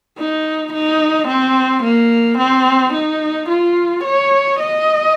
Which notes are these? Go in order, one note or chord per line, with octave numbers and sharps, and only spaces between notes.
D#4
D#4
C4
A#3
C4
D#4
F4
C#5
D#5